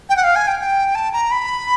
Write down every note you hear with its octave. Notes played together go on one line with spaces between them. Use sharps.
G5
F#5
F5
G#5
G5
G5
A5
A#5
B5